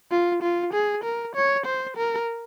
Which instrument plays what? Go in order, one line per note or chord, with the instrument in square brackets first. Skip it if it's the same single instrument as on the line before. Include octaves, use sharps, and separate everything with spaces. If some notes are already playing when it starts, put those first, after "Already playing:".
[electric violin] F4
F4
G#4
A#4
C#5
C5
A#4